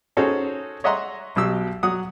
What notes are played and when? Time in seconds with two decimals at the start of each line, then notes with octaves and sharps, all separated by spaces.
0.17 C#4 D#4 F#4 G#4 A4 C5
0.84 C#5 D#5 E5 F#5 A#5 C6
1.36 B1 B2 F#3 G4 E6
1.83 F#3 F#5 D#6